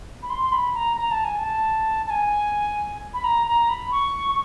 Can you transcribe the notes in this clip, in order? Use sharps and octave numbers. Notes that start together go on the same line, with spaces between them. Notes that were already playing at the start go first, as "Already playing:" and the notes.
B5
C6
C6
B5
A#5
A#5
A5
G#5
A5
A5
G#5
B5
A#5
A#5
B5
C#6
C#6